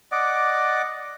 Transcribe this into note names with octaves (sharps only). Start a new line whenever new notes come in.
D5 D#5 F#5 D6